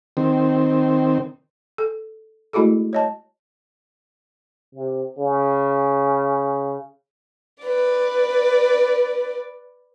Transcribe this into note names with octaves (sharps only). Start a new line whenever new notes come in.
D#3 C4
A4
G#3 A3 E4 F#4 G#4 A4
C#5 D#5 A5
C3
C#3
B4 D5